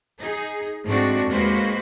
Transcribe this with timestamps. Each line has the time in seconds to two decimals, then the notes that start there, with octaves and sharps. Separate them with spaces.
0.19 D#4 G#4
0.84 G#2 A3 C4 D4 F#4
1.27 D#2 G#3 A#3 F#4 B4 C5